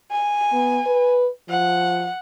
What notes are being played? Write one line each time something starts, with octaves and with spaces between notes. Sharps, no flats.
G#5
B3
B4
F3 F#5